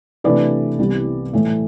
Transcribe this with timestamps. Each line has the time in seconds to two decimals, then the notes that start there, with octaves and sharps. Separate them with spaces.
0.24 C3 E3 A3 D4 B4 D5
0.79 C2 C3 E3 G3 B3
1.33 A2 E3 A3